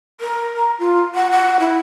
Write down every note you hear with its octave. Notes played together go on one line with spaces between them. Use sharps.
A#4
A#5
F4
F#5
F#5
E4